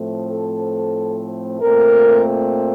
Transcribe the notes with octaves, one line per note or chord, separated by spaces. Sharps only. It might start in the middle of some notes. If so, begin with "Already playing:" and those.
Already playing: A2 F3 A3 C4
A4
A#2 A3 C4 A#4